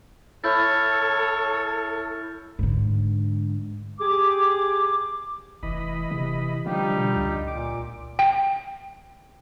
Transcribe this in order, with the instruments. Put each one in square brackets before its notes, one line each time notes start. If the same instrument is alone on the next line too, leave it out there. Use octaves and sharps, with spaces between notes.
[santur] E4 [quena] A4 [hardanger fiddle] C#5 [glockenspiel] F6 G6 A6
[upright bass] G#2 D3
[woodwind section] G4 G#4 D6
[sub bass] F1 [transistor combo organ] E3 D#5 B5
[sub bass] C3
[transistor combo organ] D3 F4 [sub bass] F3 [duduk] G3 [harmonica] D#4 G4
[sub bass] B2
C#2
[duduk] A#2 [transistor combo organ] D6
[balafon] G5